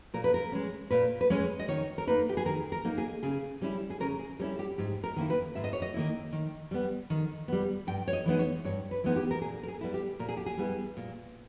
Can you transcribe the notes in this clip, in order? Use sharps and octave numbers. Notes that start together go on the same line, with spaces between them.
A#2 A#4
B4
A#4
G#3 C#4
A#2 B4
B4
G#3 C#4 C#5
D#5
D#3 C#5
A#4
A#3 D#4 B4
G4
G#4
D#3 A#4
A#4
A#3 D#4
G#4
C#3 G#4
G3 C#4 E4
G#4
C#3 A#4
G#4
G3 C#4 E4 A#4
G4
G#2 G4
A#4
D#3 A#3 E4
B4
G#2 E5
D#5
C#5
D#5
D#3 A#3 E4
D#3
G3 B3
D#3
G3 B3
G2 G5
C#5
D#5
E3 G#3 B3 D#4
C#5
G2 C#5
B4
E3 G#3 B3 D#4
G4
A#4
A#2 G#4
A#4
G#4
G3 B3 E4
G4
A#2 A#4
G#4
G4
G#4
G3 B3 E4
A#2